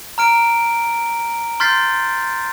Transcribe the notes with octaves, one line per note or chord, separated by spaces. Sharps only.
A#5 F6 D7
C6 F6 G6 A6 B6 C7